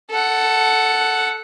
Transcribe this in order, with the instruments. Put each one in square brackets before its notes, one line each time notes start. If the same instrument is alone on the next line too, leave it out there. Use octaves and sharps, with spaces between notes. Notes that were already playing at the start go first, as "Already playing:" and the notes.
[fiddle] A4 F#5